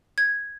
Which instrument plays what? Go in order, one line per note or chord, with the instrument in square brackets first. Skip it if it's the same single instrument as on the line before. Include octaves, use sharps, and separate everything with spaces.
[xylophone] G#6